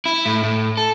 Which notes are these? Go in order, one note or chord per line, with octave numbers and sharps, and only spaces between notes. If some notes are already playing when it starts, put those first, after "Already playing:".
E4
A2
A2
A4